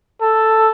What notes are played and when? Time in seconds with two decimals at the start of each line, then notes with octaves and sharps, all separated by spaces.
0.22 A4